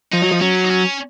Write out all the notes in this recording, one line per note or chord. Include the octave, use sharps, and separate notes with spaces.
F3 D#4
F#3
F3
F#3 C#4
D#4
C#4